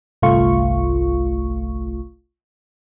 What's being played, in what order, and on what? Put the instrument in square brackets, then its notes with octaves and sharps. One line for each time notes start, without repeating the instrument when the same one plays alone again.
[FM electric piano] G1 C2 A3 F4 C#6